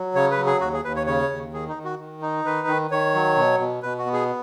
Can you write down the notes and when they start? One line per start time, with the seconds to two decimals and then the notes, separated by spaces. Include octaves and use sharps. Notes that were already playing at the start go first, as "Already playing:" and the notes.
Already playing: F#3
0.15 C#3 C#5
0.31 B4
0.38 F#3
0.46 G#4
0.61 D#2 F#4
0.73 G#4
0.84 D#2 B4
0.96 C#5
1.06 C#3 C#5
1.29 D#2
1.53 D#3 G#4
1.68 D#4
1.76 D#3
1.84 F#4
1.99 D#3
2.22 D#4
2.45 D#3 B4
2.67 D#3
2.91 D#3 C#5
3.14 F#3
3.36 B2
3.60 B2
3.83 B2 B4
3.98 F#4
4.06 B3
4.13 G#4